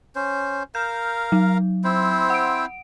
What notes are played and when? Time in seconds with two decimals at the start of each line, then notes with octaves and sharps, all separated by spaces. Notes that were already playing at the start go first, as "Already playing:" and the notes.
0.16 C#4 C5
0.75 A#4 F5 G6
1.32 F#3
1.84 C4 E4 C5
2.30 F#5 D7